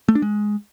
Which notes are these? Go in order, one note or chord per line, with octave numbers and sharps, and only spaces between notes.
A3
D4
G#3